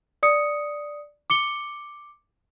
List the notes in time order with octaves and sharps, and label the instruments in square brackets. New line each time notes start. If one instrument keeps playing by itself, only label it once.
[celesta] D5 D#6 C#7
D6 C#7 G7